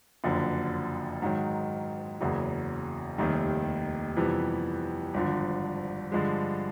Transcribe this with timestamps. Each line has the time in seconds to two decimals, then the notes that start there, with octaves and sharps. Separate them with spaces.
0.24 F#1 F2 D3 F#3
1.22 G#2 D#3 F#3
2.20 F#1 E2 C#3 F#3
3.18 F1 D#2 D#3 G3
4.16 F2 C3 E3 G3 B3
5.14 G#1 G2 D3 F3
6.12 G2 D3 F3 G#3